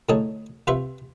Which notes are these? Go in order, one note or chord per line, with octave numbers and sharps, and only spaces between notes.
A2 D3 D#4 G#4 C#5 A5
C3 F4 B4 C5 E5 C#6